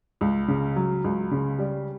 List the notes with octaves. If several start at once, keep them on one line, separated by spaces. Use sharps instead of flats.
C#2
C#3
F#3
C#2
C#3
G3